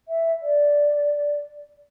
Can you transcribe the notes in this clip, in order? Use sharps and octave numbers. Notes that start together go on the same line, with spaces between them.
E5
D5